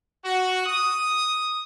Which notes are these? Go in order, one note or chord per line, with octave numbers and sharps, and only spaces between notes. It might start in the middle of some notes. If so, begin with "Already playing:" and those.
F#4
D#6